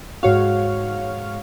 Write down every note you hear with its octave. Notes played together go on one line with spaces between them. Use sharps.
G#2 F#4 C#5 F5